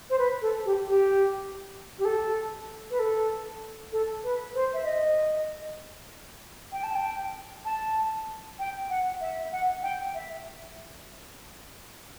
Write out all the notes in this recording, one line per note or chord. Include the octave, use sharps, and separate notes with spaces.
C5
B4
A4
G4
G4
G4
A4
B4
A4
A4
B4
C5
E5
D#5
G5
A5
G5
A5
G5
F#5
E5
F#5
G5
E5